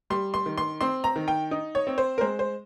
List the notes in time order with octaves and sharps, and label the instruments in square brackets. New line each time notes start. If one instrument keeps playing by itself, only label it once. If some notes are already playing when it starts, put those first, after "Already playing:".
[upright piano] G3 C6
C6
D#3
C6
C4 C6
A#5
D#3
G5
D#4
C#5
C4
C5
A#4
G#3 C5
C5